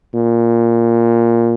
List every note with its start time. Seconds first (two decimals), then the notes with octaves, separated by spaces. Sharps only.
0.14 A#2